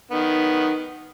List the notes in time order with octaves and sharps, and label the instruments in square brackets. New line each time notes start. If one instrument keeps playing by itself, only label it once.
[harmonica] D#3 B3